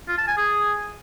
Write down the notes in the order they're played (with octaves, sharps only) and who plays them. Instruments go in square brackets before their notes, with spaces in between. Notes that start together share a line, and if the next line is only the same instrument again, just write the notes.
[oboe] F4
A5
G#5
G#4